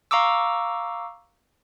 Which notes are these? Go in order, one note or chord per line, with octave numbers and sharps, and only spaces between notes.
F5 A#5 C#6 D6 E6